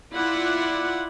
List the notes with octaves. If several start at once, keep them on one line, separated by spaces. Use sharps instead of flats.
E4 F4 D5 F#5